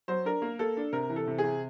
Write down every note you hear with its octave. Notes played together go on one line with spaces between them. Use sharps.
F#3 C5
D4 A#4
A#3
A#3 A4
D4
C3 A#4
E3
A4
C3
G#4
C3